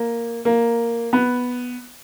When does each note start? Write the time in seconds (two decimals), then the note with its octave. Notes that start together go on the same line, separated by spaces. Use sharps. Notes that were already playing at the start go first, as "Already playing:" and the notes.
Already playing: A#3
0.45 A#3
1.13 B3